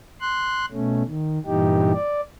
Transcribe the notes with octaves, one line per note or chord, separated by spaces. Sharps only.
C6 F#6
B2 A3 C#4
D#3
G2 A#2 E3 D#4 G4
D5